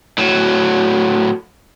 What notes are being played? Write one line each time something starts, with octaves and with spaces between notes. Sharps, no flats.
A2 F#3